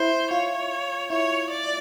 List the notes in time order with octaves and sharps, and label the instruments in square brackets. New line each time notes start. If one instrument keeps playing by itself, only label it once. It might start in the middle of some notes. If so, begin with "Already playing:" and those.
Already playing: [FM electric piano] E4 [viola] C5
[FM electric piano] F4 [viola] C#5
[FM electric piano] E4 [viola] C#5
[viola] D5